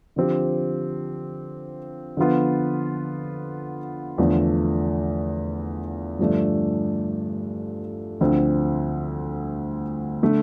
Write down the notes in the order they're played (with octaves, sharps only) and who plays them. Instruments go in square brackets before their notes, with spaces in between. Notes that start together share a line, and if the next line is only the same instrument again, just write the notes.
[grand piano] D3 F3 C4 G4
D3 F3 B3 F4
E2 D3 F3 A3
G2 D3 F3 A3 D4
D2 D3 F3 C4
D3 A3